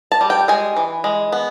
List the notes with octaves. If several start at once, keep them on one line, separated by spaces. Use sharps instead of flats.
A5
G3
G5
G#3 G#5
E3
G#3
B3